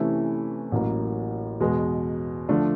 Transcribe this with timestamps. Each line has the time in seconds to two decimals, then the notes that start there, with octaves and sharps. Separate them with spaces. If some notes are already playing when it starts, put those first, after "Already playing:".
Already playing: C3 E3 A3 C#4 E4
0.72 A1 A2 F#3 A#3
1.60 E2 B2 G#3 B3
2.49 D3 F3 A3 D4